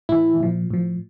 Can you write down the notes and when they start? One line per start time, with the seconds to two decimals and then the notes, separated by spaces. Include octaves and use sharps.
0.09 A2 E3 E4
0.40 A#2 F3
0.70 A2 F3